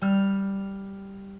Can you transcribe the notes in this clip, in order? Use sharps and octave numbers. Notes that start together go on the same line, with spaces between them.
G3 F6